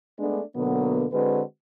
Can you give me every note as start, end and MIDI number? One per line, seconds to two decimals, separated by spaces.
0.19 0.42 56
0.19 0.42 57
0.19 0.42 59
0.19 0.42 62
0.56 1.07 47
0.56 1.07 50
0.56 1.07 54
0.56 1.07 58
0.56 1.07 59
1.13 1.41 50
1.13 1.41 56
1.13 1.41 60
1.13 1.41 66
1.13 1.41 71